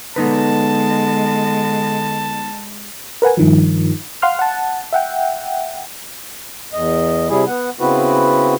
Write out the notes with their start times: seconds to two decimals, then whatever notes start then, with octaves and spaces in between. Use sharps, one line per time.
0.16 D3 G#3 B3 D#4 B4 A5
3.22 A#4 B4 F#5 G#5
3.37 G2 D#3 F3
4.22 F5 F#5 C6 F6
4.39 F#5 A5
4.93 E5 F#5 G5
6.73 E2 D#5
7.29 C3 G3 E4 G#4
7.47 B3 F#5
7.80 C#3 B3 C4 E4 F#4 B4